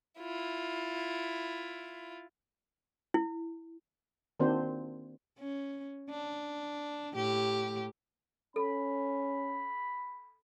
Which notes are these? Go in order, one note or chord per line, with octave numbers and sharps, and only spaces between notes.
E4 F4
E4
D#3 A#3 C4 D4 F#4 C5
C#4
D4
A2 G4
C#4 A4 B5